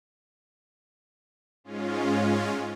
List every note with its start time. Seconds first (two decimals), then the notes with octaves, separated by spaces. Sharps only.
1.64 G#2 G#3 C#4 F4